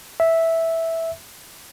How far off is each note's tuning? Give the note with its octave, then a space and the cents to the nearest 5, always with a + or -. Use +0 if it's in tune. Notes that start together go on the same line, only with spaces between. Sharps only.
E5 -5